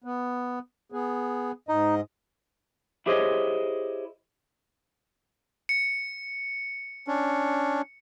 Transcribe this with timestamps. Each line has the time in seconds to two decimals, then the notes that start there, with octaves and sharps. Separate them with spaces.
0.04 B3
0.92 B3 G#4
1.69 G#2 D#4 D#5
3.06 E4 G4 G#4 C5 C#5 D#5
5.69 C#7
7.08 C#4 D4